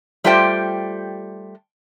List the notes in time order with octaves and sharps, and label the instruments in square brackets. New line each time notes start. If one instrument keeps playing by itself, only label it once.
[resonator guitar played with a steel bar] G3 A3 F4 G4 C5 G5